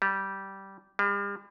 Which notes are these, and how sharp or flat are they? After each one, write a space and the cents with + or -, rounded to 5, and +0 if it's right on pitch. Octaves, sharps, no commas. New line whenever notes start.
G3 -15
G3 +40